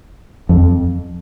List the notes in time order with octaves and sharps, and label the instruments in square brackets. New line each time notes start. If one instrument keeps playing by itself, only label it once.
[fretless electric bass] F2